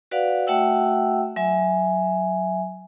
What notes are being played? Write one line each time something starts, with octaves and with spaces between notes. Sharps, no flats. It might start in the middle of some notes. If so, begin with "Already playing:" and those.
F#4 B4 D5 F5 F#5
A3 F#4 E5 F#5 G5 E6
F#3 E5 G#5